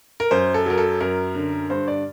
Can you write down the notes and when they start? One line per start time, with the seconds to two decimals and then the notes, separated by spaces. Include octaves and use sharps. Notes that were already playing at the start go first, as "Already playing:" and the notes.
0.20 A#4
0.31 F#2 C5
0.54 A4
0.66 F#3 A#4
0.78 A4
1.01 F#2 A#4
1.35 D3
1.70 G2 C5
1.88 D5